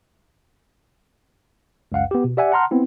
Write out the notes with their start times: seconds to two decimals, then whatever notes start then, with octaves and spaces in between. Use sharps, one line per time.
1.92 C#2 F#2 F5 F#5
2.11 B3 G4
2.24 B2
2.37 G4 D5 E5 F#5 G#5
2.52 F#5 A5 A#5 C6 F6
2.71 B3 C4 E4